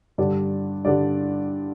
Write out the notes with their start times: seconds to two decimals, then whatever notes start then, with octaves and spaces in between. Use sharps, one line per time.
0.18 G2 D3 G3 D5
0.85 G2 D3 G3 D5